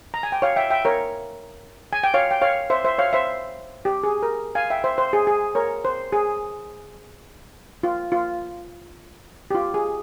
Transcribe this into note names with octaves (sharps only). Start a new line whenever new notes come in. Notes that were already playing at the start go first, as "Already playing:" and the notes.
A#5
G#5
G5
C#5 F5
E5 G5
E5 G5
A#4 C#5
G#5
G5
C#5 F5
G5
C#5 F5
C5 E5
C5 E5
C#5 F5
C5 E5
G4
G#4
A#4
F5 G#5
E5 G5
C5 E5
C5
G#4
G#4
A#4 C#5
C5
G#4
F4
F4
G4
F4
G#4